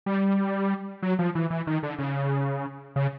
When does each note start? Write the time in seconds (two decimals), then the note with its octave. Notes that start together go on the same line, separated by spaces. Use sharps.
0.06 G3
1.03 F#3
1.19 F3
1.35 E3
1.50 E3
1.67 D#3
1.83 D3
1.98 C#3
2.96 C#3